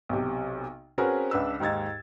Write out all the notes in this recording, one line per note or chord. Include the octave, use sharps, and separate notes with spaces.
B1 C3
C4 C#4 F#4 G#4 A#4 B4
C#2 D4 B4 E6
D#2 G#2 D#4 G#6 A6